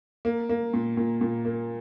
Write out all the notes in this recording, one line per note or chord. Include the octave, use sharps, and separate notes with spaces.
A#3
A#3
A#2
A#2
A#2
A#3